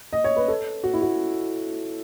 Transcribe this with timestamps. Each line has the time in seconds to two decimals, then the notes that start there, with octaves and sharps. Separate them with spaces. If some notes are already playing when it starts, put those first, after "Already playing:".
0.13 D#5
0.24 C#5
0.36 B4
0.48 A4
0.83 F#4
0.93 E4
1.02 F#4